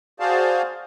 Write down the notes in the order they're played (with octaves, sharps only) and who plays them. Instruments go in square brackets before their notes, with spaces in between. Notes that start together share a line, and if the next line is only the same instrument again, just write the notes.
[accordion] F#4 G#4 C5 D5 F5 A5